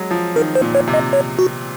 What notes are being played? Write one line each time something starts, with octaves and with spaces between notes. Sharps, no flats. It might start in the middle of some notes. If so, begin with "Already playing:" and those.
Already playing: F#3 G#3
F3
D#3 A#4
C5
A#2
C#5
C3
D#5
C#5
F#4